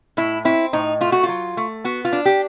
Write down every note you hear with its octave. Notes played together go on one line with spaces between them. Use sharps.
A2 E4
C4 E4
A2 D#4
A3 F4
F#4
F4
F#3
A3
B3 F#4
F4
D4
G4